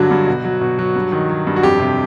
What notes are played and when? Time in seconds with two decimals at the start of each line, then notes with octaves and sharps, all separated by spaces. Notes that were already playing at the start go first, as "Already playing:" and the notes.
Already playing: G2 D3 F#3 F#4
0.11 G2
0.27 B2
0.45 F#3
0.61 B2
0.79 F#3
0.96 G2
1.12 D#3
1.29 F#3
1.47 G2
1.56 F#4
1.63 F2 G4
1.80 C3